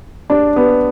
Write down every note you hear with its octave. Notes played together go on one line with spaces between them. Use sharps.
D4
B3